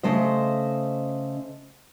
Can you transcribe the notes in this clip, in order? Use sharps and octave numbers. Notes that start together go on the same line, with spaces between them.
C#3 A3 C5 D#5